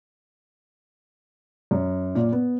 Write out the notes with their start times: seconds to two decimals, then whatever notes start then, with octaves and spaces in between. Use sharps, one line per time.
1.71 F#2
2.15 A#2
2.32 B3